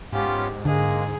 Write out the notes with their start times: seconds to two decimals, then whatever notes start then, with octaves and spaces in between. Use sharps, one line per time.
0.12 G#2 B3 C#4 F4 G4
0.65 D3 G#3 A#3 G#4